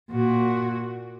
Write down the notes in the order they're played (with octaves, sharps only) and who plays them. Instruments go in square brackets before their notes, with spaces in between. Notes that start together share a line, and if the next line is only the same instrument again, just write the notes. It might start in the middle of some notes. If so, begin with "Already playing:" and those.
[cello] A#2 [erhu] F#4